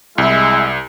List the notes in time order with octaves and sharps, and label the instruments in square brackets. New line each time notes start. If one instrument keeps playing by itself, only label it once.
[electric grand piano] C2 [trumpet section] G#3 E4